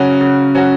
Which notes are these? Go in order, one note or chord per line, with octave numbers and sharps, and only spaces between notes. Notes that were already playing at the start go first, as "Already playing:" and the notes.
Already playing: C#3 F#3 C#4 F#4
C#3
F#3 C#4 F#4